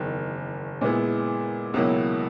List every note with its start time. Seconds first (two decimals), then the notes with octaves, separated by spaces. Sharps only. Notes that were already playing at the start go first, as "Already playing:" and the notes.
Already playing: F#1 E2 D#3
0.81 A#2 G#3 B3 E4
1.74 C#2 B2 F#3 A#3 E4